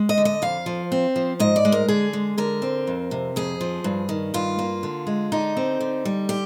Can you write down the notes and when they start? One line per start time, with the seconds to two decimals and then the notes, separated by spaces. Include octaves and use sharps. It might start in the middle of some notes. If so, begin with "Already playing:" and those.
Already playing: G#3
0.09 D#5
0.18 D3
0.25 D#5
0.42 F2 F5
0.66 F3
0.92 C4
1.16 F3
1.40 G#2 D#5
1.56 D5
1.65 G#3
1.72 A#4
1.88 D3 G#4
2.13 G#3
2.38 D3 A#4
2.62 C4
2.87 F2
3.11 C3
3.36 F2 G#4
3.61 F3
3.84 G2
4.09 D#3
4.34 G2 F4
4.59 A#3
4.83 D3
5.07 G#3
5.32 D3 D#4
5.57 C4
5.81 D3
6.05 G3
6.29 D3 G4